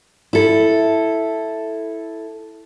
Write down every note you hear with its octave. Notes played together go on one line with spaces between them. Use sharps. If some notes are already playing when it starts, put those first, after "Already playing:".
E4 A4